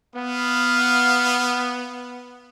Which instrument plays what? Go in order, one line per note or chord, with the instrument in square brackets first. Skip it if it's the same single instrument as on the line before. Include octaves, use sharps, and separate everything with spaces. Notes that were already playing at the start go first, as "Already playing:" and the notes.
[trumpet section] B3 [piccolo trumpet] F5